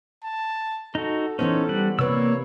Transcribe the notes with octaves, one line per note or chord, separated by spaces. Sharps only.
A5
D#4 F#4 A4
E3 B3 C#4 D#4 A4 C5
G3 F#5
C3 A#3 B4 C#5 D5 E6